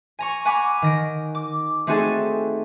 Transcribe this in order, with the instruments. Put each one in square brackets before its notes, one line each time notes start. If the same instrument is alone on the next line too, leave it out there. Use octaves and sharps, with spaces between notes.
[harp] G#5 A#5 C#6
F#5 G#5 A#5 B5 D6
D#3 A#6 D7
D6
A3 C4 D#4 F#4 G#4 A4